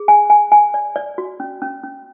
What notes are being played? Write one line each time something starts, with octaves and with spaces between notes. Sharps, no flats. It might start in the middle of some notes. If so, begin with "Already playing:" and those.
Already playing: G#4
G#5
G#5
G#5
D5
D5
F#4
C#4
C#4
C#4